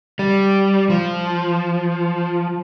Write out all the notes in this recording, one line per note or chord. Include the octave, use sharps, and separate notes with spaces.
G3
F3